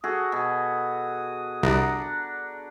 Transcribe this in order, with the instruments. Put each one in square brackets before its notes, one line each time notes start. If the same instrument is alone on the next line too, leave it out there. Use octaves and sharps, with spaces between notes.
[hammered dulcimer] F#4 G#4 A4 [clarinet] D#6
[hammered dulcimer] B2
[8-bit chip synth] C2 [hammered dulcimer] D4 F#5 A#5